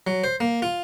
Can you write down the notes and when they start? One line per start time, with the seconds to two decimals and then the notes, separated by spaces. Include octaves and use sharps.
0.07 F#3
0.24 C5
0.40 A#3
0.62 F4